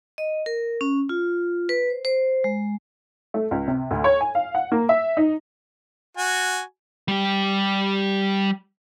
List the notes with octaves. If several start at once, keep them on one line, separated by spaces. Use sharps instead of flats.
D#5
A#4
C#4
F4
B4
C5
C5
G#3
A3
C#2
C3
D2
C#5
G#5
F5
F#5
A#3
E5
D#4
F#4 G#5
G3 G4